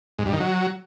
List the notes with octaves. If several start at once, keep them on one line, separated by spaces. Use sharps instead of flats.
G#2
G2
D#3
F#3